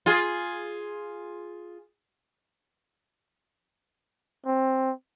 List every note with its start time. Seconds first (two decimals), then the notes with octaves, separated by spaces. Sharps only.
0.06 F4 G#4
4.46 C4